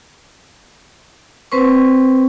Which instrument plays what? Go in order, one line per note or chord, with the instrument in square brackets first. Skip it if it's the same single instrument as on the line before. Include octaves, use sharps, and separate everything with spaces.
[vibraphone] C4 B4 C5 C#6